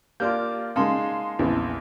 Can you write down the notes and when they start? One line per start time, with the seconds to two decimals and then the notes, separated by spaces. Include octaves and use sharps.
0.20 A#3 D4 F4 G4 D6 F6 G6
0.76 C#3 G#3 A#3 D#4 F5 A5 C6
1.39 A#1 E2 C#3 E3 C4